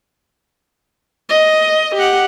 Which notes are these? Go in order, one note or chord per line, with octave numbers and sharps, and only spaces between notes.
D#5
G4 F#5